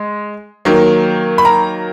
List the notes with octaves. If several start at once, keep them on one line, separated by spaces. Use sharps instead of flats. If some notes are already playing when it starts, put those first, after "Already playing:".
Already playing: G#3
D#3 F#3 A#3
B5
A#5